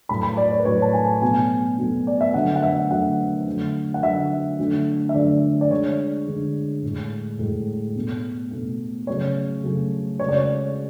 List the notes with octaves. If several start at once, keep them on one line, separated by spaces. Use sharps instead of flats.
A2 F#3 A3 B5
B5
D5
C#5
B4
A2 F#3 A3 C#5
A5
G#5
B2 F#3 A3 G#5
B2 F#3 A3
D5
E5
D3 F#3 A3 F#5
F#5
E5
D3 F#3 A3 F#5
D3 F#3 A3
F#5
D3 F#3 A3 E5
D3 F#3 A3
E5
D3 F#3 A3 D5
D5
D3 G#3 C#5
D3 G#3
A2 G#3
A2 G#3
B2 A3
B2 A3
C#3 F#3 A3 C#5
C#3 F#3 A3
C#3 G#3 C#5
D5
C#5